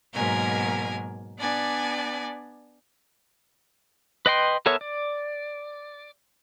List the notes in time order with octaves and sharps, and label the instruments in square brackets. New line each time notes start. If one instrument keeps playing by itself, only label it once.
[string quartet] G#2 B2 F#3 A#3 A#4 G#5
B3 D4 D5 G#5
[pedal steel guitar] B4 D#5 G5 C6
B3 A4 A#4 C#5 E5
D5